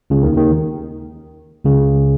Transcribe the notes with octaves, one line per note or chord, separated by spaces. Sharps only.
C#2 C#3
D#2 D#3
D#2 D#3
C#2 C#3